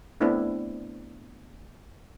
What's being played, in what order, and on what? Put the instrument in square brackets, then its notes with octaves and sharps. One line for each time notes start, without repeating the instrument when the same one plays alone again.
[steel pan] A3 B3 C4 D4 E4